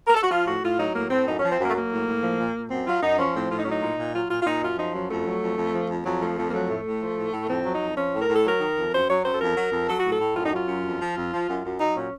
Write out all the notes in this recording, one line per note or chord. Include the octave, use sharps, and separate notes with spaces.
A#4
A4
F#4
F3 F4
A2 F#4
A2 F4
F#3 D#4
A2 A#3
A2 C4
F#2 D#4
F3 C#4
C4
F#2 A#3
A3
F#3 A#3
A2
A2
F3
A#2
A#2
F#2 C4
F#3 F4
F#2 D#4
F3 C#4
A2 C4
A2 F4
D#4
F#3 C#4
D#4
A#2
A#2
F#3 F4
A#2 F4
F4
A#2 D#4
F#2 F4
F3 D#4
F#2 F#3
F2 A3
F#3
F2
F2
F3
F2
F2 F#3
F3 A3
F2 A3
A#3
F#3 A3
A2
A2
F3
A2
A2
F2 C4
F#3
D#4
F2
F3 C#4
A2
A#4
A2 A4
F#3 A#4
D#3
F2
F#2 C5
F#3 C#5
F#2 C5
A4
F2 A#4
F#3
F2
F#3 A4
F#4
A2 A4
A2
F#2 F4
D#4
F#3 F4
F#2
F2
F3
F2
F3
F#2
F#2
F#3 D#4
A#2 C#4